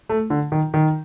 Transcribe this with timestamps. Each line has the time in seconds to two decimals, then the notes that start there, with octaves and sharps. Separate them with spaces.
0.09 A3
0.30 D3
0.52 D#3
0.74 D#3